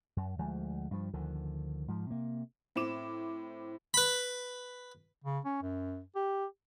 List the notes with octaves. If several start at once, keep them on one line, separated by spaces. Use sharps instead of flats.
F#2
D2 F3 G#3
G2 F3
D2 D3 D#3 F3
G#2 F3
C3 A#3
A2 C4 D6 E7
B4 B5
C#3
C#4
F#2
G4